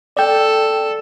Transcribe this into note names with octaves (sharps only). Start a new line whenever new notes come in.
A4 D5 G5